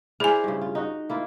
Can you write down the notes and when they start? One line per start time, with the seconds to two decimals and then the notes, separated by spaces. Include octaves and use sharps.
0.20 E4 G#4 C5 D5 G#5
0.44 G2 C#3
0.61 F4
0.75 D#4 F#4
1.10 A#3 E4 F4